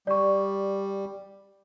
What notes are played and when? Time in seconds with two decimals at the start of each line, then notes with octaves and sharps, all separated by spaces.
0.07 G3 D5 C#6